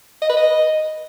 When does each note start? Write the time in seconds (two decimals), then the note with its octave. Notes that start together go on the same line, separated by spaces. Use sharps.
0.22 D#5
0.29 B4
0.37 D#5